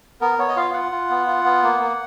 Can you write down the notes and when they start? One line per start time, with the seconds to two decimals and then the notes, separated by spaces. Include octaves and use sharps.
0.21 B3 A#4
0.38 B3 C#5
0.48 D#5
0.56 F4 F5
0.73 F4 F#5
0.92 F4
1.10 B3
1.27 F4
1.44 B3
1.63 A#3
1.80 A#3